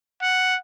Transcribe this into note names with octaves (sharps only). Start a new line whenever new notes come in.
F#5